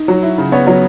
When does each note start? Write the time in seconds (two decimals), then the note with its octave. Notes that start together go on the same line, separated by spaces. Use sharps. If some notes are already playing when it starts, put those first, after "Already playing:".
Already playing: D#4
0.08 F#3
0.22 E4
0.38 C#3
0.52 B3 C#5
0.67 F#3 C#5